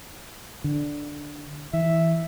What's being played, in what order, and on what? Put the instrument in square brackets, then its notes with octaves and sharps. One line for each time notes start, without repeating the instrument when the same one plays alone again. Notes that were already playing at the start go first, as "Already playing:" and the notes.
[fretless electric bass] D3
[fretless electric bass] E3 [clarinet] E5